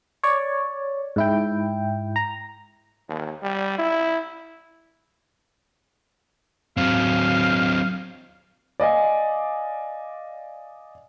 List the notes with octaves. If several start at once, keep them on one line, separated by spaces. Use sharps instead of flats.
C#5 D5
G#2 E4 G5
A#5
D#2
G3
E4
F#3 C4 F5
D5 D#5 F5 G#5